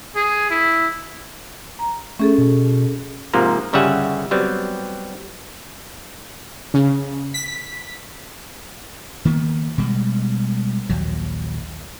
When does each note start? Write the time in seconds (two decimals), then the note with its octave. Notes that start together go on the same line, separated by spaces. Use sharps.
0.16 G#4
0.51 E4
1.79 A#5
2.19 A3 C#4 G#4 A4
2.38 B2
3.34 G#2 C3 F3 A#3
3.73 G1 C#3 G3 E5 F#5 G#5
4.31 F#3 G3 B3 C4
6.74 C#3
7.34 B6
9.25 D#3 A#3 B3
9.78 B2 G3 G#3
10.89 A#1 D#2 F#3